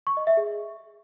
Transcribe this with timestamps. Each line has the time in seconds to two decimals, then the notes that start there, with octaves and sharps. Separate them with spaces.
0.07 C#6
0.17 D#5
0.27 E5
0.37 G#4